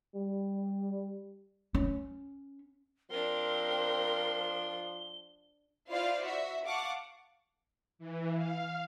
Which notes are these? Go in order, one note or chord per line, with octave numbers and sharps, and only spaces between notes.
G3
C#4
F3 C4 D4 A#4 C6 G7
E4 F4 C5 D5 F5
F#4 E5
F5 F#5 A5 C#6 D6
E3
F5